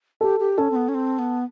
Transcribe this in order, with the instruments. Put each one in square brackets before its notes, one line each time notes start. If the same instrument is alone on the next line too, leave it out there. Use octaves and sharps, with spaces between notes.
[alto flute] G4 [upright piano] A4
[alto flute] G4
[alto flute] C#4 [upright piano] A4
[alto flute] C4
B3
C#4
C4
B3